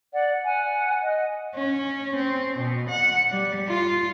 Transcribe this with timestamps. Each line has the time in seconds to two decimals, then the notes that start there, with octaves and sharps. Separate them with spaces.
0.13 D5 F#5
0.44 F#5 G#5
1.02 D#5
1.56 C#4
2.15 C4
2.57 B2
2.88 F#5
3.30 G3
3.68 F4